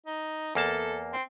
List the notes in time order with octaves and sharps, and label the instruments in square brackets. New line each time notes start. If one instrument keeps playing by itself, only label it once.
[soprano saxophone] D#4
[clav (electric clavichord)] E2 A#3 A5 [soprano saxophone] A4
[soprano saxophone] C4